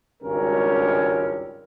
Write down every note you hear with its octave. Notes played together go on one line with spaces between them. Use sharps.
G#1 C#2 G2 G3 C#4 A#4